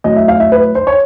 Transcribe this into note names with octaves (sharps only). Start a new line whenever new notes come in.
A2 F#3 D#5
E5
F5
E5
B4
C5
C#5